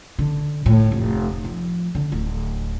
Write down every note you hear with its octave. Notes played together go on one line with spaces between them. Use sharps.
D3
A2
F1
F3
D3
D1